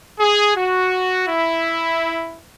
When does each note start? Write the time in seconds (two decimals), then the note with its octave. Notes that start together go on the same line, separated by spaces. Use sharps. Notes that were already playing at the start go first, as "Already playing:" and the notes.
0.20 G#4
0.56 F#4
1.28 E4